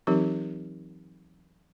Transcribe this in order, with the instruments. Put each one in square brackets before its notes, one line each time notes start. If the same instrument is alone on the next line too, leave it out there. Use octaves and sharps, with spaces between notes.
[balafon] E3 F#3 C4 D#4 G4 A#4